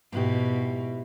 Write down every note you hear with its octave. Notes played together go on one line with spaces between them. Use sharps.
G#2 B2 E4 G4